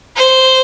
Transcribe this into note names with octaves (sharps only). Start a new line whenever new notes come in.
C5